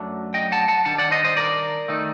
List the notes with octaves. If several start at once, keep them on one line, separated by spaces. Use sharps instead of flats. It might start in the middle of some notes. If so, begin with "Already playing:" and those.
Already playing: F#2 F#3 A3 D4
D#5 G5
F#5 A5
F#5 A5
D#3 G3 D4 F#5 A5
D5 F#5
C5 D#5
C5 D#5
A#4 D5
D#3 A3 D#4